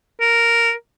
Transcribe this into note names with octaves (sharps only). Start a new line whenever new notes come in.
A#4